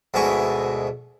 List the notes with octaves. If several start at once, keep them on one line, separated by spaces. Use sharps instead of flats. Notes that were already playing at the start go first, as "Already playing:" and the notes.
D2 G#2 B2 E4 G#4 C#6